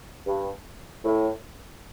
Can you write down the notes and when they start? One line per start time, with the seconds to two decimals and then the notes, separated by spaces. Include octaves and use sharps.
0.27 G2
1.05 A2